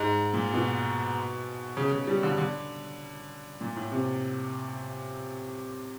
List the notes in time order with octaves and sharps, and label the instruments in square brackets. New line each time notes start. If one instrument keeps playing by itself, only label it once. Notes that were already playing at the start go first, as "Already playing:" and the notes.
Already playing: [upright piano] G#2
A#2
B2
C#3
C#3
G3
D3
D3
A#2
A2
C3